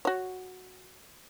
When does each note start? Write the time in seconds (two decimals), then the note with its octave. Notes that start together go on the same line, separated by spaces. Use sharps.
0.05 F#4 C#5